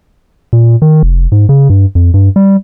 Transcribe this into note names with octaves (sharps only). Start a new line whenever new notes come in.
A#2
D#3
F1
G#2
C#3
G2
F2
G2
G3